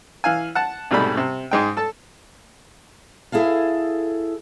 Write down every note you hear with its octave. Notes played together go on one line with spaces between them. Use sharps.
E3 F5 G#5
F#5 A5
C2 G#2 B2 G3 A3 B5
C3
G#2 G#3 G5
A4 A5
E4 G#4 A4 F5